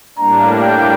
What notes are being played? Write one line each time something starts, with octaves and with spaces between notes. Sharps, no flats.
A2 G3 A#3 D4 A#5
G5